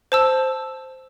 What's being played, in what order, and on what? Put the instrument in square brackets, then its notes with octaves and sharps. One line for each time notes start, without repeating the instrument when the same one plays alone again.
[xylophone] C5 A5 E6